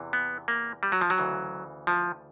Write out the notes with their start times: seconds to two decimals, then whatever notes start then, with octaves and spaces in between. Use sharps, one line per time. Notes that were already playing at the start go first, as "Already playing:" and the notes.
Already playing: E2 C3 E3
0.13 B3
0.48 A#3
0.83 G3
0.92 F#3
1.01 F3
1.10 F#3
1.18 D2 C#3 E3
1.87 F3